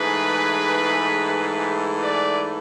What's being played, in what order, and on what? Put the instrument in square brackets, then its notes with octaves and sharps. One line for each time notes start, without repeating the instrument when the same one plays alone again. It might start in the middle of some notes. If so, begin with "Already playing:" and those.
Already playing: [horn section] G#2 E3 A3 G#4 B4
B4 D5